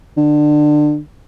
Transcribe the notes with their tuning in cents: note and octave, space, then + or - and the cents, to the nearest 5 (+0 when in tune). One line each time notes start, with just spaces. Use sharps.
D3 +25